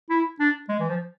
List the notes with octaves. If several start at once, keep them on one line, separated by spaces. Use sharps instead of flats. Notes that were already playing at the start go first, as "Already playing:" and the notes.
E4
D4
G#3
E3
F3